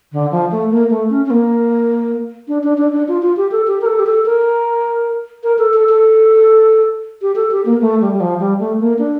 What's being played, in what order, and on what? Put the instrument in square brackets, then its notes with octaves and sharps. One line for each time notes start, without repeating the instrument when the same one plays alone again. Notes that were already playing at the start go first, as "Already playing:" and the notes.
[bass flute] D3
F3
A3
A#3
A3
C#4
C#4
A#3
D4
D4
D4
D4
F4
F4
G4
A4
G4
A#4
A4
G4
A4
A#4
A#4
A4
A4
A4
G4
A4
G4
A#3
A3
G3
G3
F3
G3
A3
A#3
D4